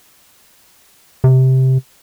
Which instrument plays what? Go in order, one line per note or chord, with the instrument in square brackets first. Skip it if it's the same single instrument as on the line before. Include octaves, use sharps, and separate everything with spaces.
[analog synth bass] C3